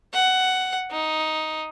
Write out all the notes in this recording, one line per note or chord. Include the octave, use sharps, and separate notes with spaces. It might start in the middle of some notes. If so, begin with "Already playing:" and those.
F#5
D#4